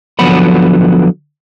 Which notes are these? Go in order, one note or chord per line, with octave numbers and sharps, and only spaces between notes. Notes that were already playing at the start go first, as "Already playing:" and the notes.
D3 F3 F#3 B3 F#5 B5